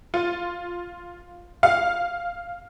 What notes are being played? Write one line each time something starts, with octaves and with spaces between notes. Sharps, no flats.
F4
F5